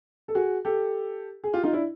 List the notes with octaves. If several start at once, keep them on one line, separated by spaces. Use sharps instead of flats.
A4
F#4 G#4
G4 A4
G#4
F4 G4
D#4 F4
D4 E4